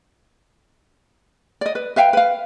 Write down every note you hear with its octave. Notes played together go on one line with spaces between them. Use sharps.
D5 D#5
B4
B4 E5 F5 G5
B4 F5